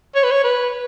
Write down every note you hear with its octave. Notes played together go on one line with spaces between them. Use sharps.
C#5
B4
C#5
B4